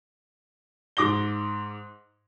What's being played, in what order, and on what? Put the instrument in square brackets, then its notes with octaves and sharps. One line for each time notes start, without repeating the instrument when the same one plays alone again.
[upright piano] G#2 D6 A#6 G7